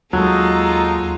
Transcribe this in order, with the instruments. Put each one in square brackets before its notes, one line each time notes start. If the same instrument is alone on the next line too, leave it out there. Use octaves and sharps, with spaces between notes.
[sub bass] D#2 [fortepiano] F#3 [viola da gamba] G#3 F4 [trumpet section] D#4 A4